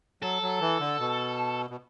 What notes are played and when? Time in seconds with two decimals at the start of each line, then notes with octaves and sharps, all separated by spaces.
0.22 F#3 A4
0.42 F#3
0.61 E3
0.80 D3
1.00 B2
1.70 B2